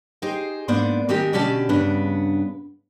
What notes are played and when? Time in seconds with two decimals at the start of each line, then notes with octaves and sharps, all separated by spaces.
0.22 D#4 G4 G#4 C5
0.68 G#2 A#3 B3 D4 C5 D5
1.09 D#3 G#3 C4 D#4 G4 A#4
1.33 B2 D3 C#4 G4 D5 A5
1.69 G2 C#3 B3 D4